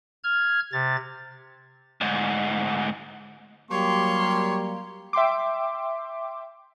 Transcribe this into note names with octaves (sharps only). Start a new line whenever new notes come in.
F6 G#6
C3 A6
D2 G#2
F#3 G3 A#3 G4 C#5 C6
E5 G5 C6 D6